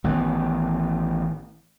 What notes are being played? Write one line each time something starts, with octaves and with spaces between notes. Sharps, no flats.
A1 D#3 E3 B3